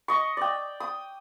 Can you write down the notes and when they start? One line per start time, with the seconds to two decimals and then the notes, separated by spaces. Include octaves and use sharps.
0.08 D#5 C#6
0.37 D5 G5
0.80 D#6